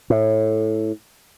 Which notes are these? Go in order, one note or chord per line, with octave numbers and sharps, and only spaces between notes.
A2